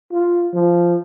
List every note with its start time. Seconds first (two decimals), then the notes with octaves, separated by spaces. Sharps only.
0.12 F4
0.54 F3